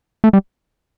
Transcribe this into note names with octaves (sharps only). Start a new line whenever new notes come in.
A3
G3